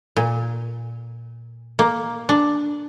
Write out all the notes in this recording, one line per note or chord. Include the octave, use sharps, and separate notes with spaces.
A#2
A#3
D4